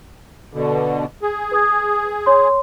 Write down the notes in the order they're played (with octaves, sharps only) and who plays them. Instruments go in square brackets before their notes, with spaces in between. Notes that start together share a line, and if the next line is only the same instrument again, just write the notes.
[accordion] B2 D3
G#4
[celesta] B4 D#6 G#6
C#5 C6